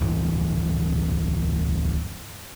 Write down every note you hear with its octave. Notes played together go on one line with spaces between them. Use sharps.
D1 G2 E3